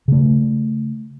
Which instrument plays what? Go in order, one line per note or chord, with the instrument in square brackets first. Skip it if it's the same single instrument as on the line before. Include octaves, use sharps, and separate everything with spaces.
[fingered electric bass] C#3 A3